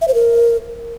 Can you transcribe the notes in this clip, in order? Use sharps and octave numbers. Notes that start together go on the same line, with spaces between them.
E5
C5
A#4